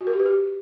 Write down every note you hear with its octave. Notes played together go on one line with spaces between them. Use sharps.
F#4
A#4
G4
B4
G4